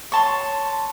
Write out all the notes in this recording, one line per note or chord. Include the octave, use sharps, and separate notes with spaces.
C#5 A5 C6